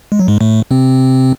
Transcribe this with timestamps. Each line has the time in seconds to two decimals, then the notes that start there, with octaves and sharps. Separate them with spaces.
0.12 G#3
0.19 F#3
0.28 G#2 G#3
0.40 A2 A3
0.71 C3 C4